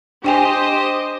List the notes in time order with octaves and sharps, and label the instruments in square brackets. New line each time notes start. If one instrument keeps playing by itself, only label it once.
[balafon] D4 G5 G#5 [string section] G4 C5 D#5